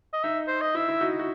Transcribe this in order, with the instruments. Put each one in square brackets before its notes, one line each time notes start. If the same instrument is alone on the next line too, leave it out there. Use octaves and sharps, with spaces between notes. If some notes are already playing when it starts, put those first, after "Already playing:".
[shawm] D#5
[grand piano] D#4 [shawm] E5
[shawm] C5
D#5
[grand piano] E4 [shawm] E5
[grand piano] E4
D#4 F#4
F#4